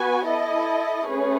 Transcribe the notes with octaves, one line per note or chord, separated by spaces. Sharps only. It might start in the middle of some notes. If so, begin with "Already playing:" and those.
Already playing: B3 F#4 B4 G#5
E4 A4 D#5
A3 C#4 G#4 B4